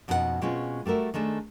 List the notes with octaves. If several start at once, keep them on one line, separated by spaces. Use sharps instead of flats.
F2 B2 C#4 D#4 G4 F#5
B2 G#3 C4 C#4 F4
G3 A3 F#4 A#4 E5
D#3 G#3 A3 D4